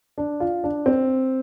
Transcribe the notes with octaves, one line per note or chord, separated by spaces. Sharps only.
D4
F4
D4
C4